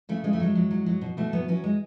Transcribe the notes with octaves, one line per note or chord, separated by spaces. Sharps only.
C#3 A3
C#3 G#3
A3
F#3 G#3
F#3
F#3
F#3
B2
B2 A3
F#3 B3
F#3 C#4
G#3